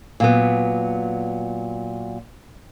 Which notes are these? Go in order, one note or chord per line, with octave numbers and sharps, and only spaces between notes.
A#2 F#3 B3